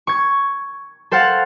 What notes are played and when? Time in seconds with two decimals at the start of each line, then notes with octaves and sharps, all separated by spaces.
0.07 C#6 G#6
1.11 A4 C5 F5 F#5 A6